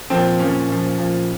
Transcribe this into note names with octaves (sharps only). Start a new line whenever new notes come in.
A#2 F3 C4
A#2 F3 C#4
A#2 F3
A#2 F3